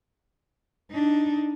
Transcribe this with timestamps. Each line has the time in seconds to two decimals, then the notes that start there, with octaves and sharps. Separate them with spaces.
0.91 D4 D#4